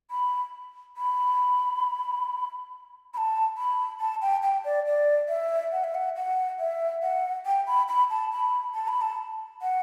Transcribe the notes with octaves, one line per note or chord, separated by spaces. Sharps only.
B5
B5
B5
A5
B5
A5
G5
G5
D5
D5
E5
F#5
E5
F#5
F#5
E5
F#5
G5
B5
B5
A5
B5
A5
B5
A5
F#5